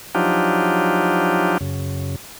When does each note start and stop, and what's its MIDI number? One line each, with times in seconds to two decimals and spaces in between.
0.15 1.58 53
0.15 1.58 54
0.15 1.58 62
0.15 1.58 63
0.15 1.58 65
0.15 1.58 67
1.61 2.16 42
1.61 2.16 49